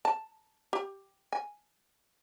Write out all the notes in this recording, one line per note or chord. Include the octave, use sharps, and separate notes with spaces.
A5
G4
G#5